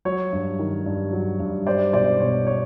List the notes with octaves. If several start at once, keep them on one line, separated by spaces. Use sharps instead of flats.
F#3 C#5
G2
D#3
G2
F#3
G2
G3 C5 D5
B1 C5 D5
B2 C#5
C#5